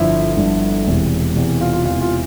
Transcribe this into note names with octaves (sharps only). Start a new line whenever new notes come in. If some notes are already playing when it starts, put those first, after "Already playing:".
Already playing: G1 G2 D3 F3 E4 E5
G1 G2 D3 F3
E1 E2 C3 E3
E1 E2 C3 E3
F4 F5
F4 F5
E1 E2 C3 E3 F4 F5
F4 F5